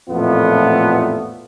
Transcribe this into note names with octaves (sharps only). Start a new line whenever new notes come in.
A1 F2 A#2 A3 B3 F4